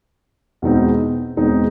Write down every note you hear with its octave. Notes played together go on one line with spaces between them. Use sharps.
E2 B2 G#3 C4 D#4
E2 B2 G#3 C4 D#4